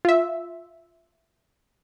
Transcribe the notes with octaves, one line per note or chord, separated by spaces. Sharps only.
F4 E5